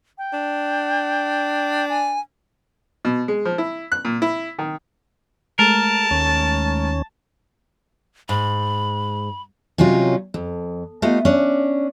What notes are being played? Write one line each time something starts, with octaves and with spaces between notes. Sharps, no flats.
G5
D4
G#5
B2
G#3
F3
E4
F#6
A#2
E4
D#3
G#3 A3 A#4 A5
D#2 C#4
G#2 B5
C3 F#3 C#4 D#4 F4
F2
A3 B3 F4 G4 D#5
C#4 D4